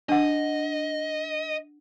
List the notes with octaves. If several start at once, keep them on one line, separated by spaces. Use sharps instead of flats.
D4 D#5 F#5